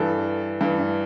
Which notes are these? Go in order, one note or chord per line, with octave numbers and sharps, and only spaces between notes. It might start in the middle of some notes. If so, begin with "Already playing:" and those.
Already playing: G2 E3 A4
G2 E3